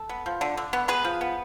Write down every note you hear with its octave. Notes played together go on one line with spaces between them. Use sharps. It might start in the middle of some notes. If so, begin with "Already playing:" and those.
Already playing: A4
B3
F3
D3
D3
B3
B3 G#4 B4
F3
B3